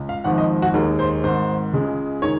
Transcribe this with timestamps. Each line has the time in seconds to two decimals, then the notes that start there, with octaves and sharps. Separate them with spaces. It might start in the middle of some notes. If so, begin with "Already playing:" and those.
Already playing: C#2
0.09 F5
0.24 G#1 G#2 F3 F#5
0.38 D#5
0.62 F#4
0.74 D#2 D#3 G#3 A#4
0.99 C5
1.23 G#1 G#2 D#3 C5
1.73 C#2 C#3 G#3
2.22 D#3 G#3 C#5